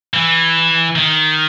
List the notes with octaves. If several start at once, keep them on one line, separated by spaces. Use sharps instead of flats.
E3
D#3